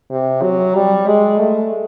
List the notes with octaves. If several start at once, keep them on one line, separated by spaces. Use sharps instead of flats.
C3
F#3
G3
G#3
A3